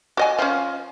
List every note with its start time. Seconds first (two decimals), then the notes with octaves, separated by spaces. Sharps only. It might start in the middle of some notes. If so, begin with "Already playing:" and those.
0.17 F#4 D#5 G#5
0.39 F3 C#4